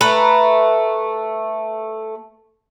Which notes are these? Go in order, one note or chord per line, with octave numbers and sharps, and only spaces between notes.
A3 B4 A#5